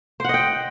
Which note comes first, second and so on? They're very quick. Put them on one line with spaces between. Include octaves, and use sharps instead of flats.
C5 F#5 D#5 G5